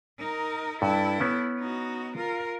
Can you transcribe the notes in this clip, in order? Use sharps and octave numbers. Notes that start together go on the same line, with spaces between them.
D#4 A#4
G2 E4 A4
B3 C#4
D#4 F#4
F4 A#4